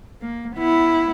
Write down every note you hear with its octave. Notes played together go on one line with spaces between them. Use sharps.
A#3
B3 E4